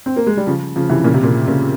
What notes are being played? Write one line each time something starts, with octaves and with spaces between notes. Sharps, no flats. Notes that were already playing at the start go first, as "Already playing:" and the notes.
C4
A#3
G#3
G3
C#3 F3
C#3 F3
C3 E3
A#2 C#3
C3
A#2 C#3
A#2 C#3